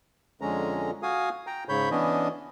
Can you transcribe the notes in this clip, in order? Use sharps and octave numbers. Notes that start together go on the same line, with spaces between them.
F2 D3 G#3 C#4 A#5
F#4 F5 G#5 D#6
G5 A#5
G#2 C#3 C#5 B5 G6
E3 B3 C#4 D4 D#5